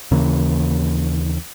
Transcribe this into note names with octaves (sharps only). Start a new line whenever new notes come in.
D#2 C#3 E3 A#3